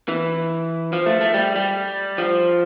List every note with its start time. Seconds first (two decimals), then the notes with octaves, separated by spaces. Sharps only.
0.08 E3
0.93 F3
1.06 A3
1.21 A3
1.34 G3
1.56 G3
2.18 F3